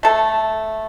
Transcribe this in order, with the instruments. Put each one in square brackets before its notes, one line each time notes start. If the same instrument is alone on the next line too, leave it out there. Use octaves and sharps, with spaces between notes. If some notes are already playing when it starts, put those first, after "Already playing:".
[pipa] A3 A4